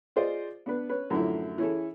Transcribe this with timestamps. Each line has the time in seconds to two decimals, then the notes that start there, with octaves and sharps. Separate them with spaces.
0.16 F4 G#4 C5 D5 D#5
0.66 B3 D4 B4
0.89 C#4 B4
1.10 F#2 A2 D3 F3 E4
1.58 E3 C#4 E4 G#4 A4